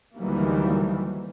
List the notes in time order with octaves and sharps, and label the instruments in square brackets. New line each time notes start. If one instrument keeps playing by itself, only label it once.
[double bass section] D2 D#3 E3 F#3 G3 A#3